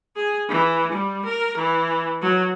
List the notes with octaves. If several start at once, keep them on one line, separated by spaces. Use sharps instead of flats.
G#4
E3
G3
A#4
E3
F#3